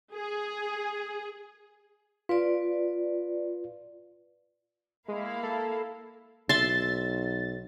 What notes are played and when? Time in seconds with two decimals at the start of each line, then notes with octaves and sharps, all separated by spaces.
0.14 G#4
2.29 F4 B4 D5
5.08 G#3 A#3 E4 F5
5.43 A4
6.49 B1 E5 C6 A6